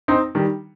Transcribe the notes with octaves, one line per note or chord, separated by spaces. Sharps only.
C4 D#4
D#3 G3